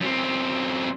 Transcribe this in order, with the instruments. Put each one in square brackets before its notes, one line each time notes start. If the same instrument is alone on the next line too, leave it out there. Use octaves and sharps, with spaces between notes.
[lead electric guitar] F#2 C4